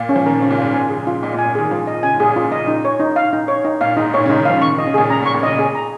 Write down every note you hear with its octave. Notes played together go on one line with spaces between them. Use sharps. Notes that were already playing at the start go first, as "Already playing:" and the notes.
Already playing: A#2 F5
C#4
F3
D#3 A#4
C#3 C#4
A#2
G#2 F5
G#5
G#4
F4
A#2 D#5
A#2
G#5
D#3 G#4
F3 F4
D#5
C#3 G#5
G#2
A#2 G#4
F4
D#5
D#4
C#5
D#4
F5
D#4
C#5
D#4
A#2 F5
G#2 D#4
A#2 C#5
C#3
D#4
D#3
F3 F5
D#3 C#6
D#3
D#5
C#3
A#2 G#4
C#3 A#5
A#2
C#6
A#2
C#3 D#5
G#4
A#5